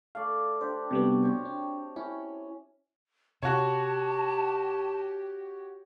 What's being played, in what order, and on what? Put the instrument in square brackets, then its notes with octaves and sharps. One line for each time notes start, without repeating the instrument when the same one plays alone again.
[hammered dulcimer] A3 D5 [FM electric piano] F5
[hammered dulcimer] D4 G4 [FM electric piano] C5
[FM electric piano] C3 G3 B3 [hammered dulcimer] F#4
[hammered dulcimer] C4 G4 C#5
[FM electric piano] D4
[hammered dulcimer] C#4 [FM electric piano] E4
[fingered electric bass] C3 [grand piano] F#4 C#5 [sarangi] G4 [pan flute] A5